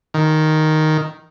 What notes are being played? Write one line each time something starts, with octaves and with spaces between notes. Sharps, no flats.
D#3